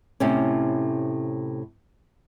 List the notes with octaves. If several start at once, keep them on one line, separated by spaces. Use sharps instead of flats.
A2 C3 C#4